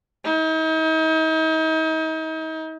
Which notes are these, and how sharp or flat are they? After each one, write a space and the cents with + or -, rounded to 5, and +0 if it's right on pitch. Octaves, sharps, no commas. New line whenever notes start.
D#4 +40